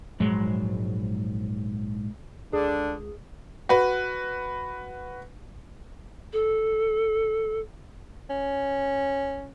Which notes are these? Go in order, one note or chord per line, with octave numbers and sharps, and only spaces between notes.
A#1 G#2 F#3 G#3
C#2 D3 D4 G#4
F#4 B4
A4
C#4